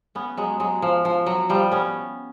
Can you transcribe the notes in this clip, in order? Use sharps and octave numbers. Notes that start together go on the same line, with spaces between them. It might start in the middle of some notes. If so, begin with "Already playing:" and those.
B3 C#4
F#3 G#3
F#3 G#3
F3
F3
F#3
F3 G3
B3 C#4